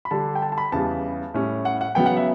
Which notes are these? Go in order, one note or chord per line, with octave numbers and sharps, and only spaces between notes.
B5
D3 G3 D4 A5
G5
A5
A5
B5
E2 C#3 G3 A5
A2 G3 C#4
F#5
F#5
C#3 F#3 B3 G5
F#5
E5